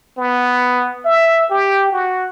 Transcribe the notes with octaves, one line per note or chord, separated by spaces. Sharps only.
B3
E5
G4
F#4